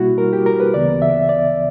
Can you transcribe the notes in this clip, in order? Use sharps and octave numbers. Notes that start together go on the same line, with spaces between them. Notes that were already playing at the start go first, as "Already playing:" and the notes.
Already playing: B2 G3 A#3 E4 F#4
A#4
G4
A#4
B4
D2 C#3 E3 B3 D5
E5
D5